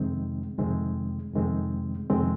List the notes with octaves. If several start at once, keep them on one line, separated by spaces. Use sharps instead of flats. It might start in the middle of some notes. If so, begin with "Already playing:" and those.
Already playing: F2 C3 D#3 G#3 C4
F2 C3 D#3 G#3 C4
F2 C3 D#3 G#3 C4
F2 C3 D#3 G#3 C4